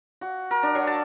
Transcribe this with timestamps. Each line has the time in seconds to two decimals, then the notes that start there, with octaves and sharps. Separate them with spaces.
0.21 F#4
0.51 A#4
0.63 D4
0.75 F#3
0.87 A5